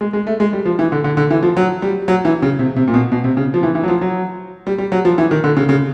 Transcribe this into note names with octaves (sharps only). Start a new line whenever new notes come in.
G#3
G#3
A3
G#3
G3
F3
E3
D3
D3
D3
E3
F3
F#3
G3
F#3
E3
C#3
C3
C3
A#2
B2
B2
C3
C#3
F3
E3
E3
F#3
F3
F#3
G3
G3
F#3
F3
E3
D#3
D3
C#3
C#3